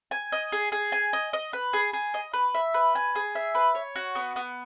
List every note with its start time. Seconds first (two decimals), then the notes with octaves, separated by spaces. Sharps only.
0.11 G#5
0.32 D#5
0.52 G#4
0.72 G#4
0.92 G#5
1.13 D#5
1.33 D#5
1.53 B4
1.73 G#4
1.93 G#4
2.14 D#5
2.33 B4
2.54 E5
2.74 B4
2.95 G#5
3.15 G#4
3.35 E5
3.55 B4
3.75 C#5
3.95 F#4
4.15 B3
4.36 B3